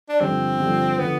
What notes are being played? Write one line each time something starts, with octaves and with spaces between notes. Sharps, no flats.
D4
G2 D3 F3 C4
G2 D3 F3
D3 F3 B3